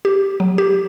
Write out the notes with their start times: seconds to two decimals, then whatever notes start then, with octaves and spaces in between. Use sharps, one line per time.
0.05 G4
0.40 F#3
0.58 G4